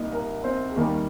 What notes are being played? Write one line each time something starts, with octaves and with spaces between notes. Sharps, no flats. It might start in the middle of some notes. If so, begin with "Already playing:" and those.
Already playing: C2 A#2 G3 A#3 D#4 D#5
A#4
C4 C5
G#4
D#2 D#3 G3 A#4